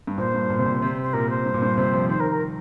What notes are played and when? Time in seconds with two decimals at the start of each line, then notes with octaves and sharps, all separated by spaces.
0.07 G2
0.18 A#2 C5
0.34 G2
0.50 A#2
0.59 C3
0.66 A#2
0.82 C3
1.02 C5
1.13 A#2 A#4
1.30 C5
1.46 G2
1.54 A#2
1.62 G2
1.78 C3
1.94 F3
2.09 D#3 C5
2.20 A#4
2.31 A#4